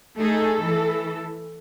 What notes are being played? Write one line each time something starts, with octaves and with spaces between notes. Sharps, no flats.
A3 D#4 G#4 A4
E3